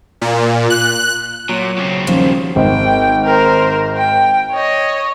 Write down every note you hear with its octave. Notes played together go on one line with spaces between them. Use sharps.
A#2
F#6
A#2 F#3
C#3 C4
D#1 F3
G#1 G5
A#4 C5
G5
C#5 D#5